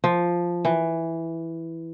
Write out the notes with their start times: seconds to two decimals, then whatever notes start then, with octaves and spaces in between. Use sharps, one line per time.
0.04 F3
0.65 E3